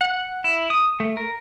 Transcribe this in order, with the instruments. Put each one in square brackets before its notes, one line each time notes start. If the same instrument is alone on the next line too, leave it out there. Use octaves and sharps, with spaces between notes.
[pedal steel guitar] F#5
E4
D#6
A3
A#4